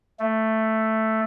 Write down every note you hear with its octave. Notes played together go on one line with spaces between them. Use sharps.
A3